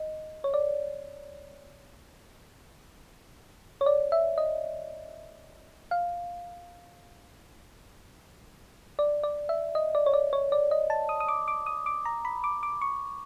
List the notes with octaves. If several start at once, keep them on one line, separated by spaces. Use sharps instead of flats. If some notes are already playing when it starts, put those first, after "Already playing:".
Already playing: D#5
C#5
D5
C#5
D5
E5
D#5
F5
D5
D5
E5
D#5
D5
C#5
D5
C#5
D5
D#5
A5
D#6
D#6
D6
D6
D#6
D6
A#5
B5
D6
D6
C#6